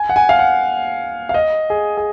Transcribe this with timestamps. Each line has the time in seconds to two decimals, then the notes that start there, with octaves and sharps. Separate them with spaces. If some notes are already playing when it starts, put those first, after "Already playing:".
Already playing: G#5
0.09 F#5
0.16 G#5
0.29 F5
0.39 F#5
1.29 F5
1.34 D#5
1.70 G#4
1.97 G#4